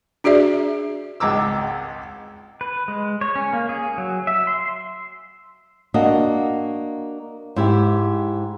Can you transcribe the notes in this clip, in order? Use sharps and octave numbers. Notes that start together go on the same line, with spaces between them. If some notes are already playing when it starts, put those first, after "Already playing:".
D4 F#4 G#4 D5 E5
G#1 C#2 G#3 A#5 D6 E6
B4
G#3
C#5
C#4
A#3
G#4
F#3
E5
C6
A#3 D4 F#4 D#5
G#2 E4 G4